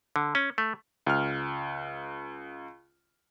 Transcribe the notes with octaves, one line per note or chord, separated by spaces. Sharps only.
D3
C#4
A3
C#2 F6